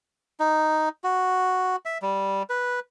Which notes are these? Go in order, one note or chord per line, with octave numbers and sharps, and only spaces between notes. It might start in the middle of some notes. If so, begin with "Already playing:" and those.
D#4
F#4
E5
G3
B4